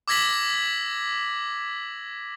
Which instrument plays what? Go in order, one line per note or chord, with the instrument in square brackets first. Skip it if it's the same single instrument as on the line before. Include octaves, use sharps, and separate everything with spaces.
[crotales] D6 E6 G#6 A#6 B6 F#7